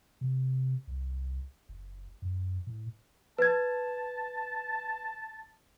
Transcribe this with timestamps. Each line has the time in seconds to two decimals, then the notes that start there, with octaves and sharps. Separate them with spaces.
0.21 C3
0.87 C2
1.69 F#1
2.22 F#2
2.67 A2
3.38 B4 A5 G#6